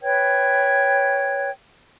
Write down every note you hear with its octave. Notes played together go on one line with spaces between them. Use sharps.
B4 C#5 G5 G#6